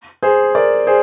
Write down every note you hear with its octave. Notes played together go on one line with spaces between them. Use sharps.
G#4 C5
A#4 D5
G#4 C5